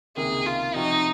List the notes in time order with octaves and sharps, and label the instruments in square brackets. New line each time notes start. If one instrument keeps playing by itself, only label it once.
[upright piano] C#2 C3 D#3 A#3 [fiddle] G#4
[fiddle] F4
[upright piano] C3 F3 C4 F#4 [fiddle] D#4